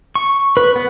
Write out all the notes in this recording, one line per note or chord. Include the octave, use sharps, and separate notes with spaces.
C#6
B4
B3